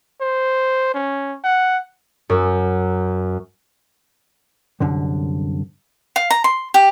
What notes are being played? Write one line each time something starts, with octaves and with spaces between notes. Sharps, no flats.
C5
C#4
F#5
F#2
C2 F#2 D3
F5
A#5
C6
G4